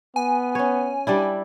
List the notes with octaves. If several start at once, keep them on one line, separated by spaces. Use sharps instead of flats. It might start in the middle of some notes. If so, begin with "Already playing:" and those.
B3 G#5
C#4 C#5
G3 D4 E4